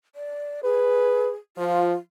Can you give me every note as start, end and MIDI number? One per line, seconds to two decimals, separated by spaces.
0.15 0.60 74
0.64 1.34 68
0.64 1.29 71
1.57 1.93 53
1.57 1.95 65